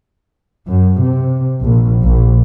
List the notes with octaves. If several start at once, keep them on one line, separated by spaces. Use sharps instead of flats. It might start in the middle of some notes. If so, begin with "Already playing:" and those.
F#2
C3
A#1
A#1